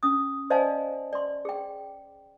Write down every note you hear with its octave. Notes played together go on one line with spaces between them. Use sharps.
C#4 D#6
C5 D5 D#5 F5 G#5 A5
D5 C6
G#4 G5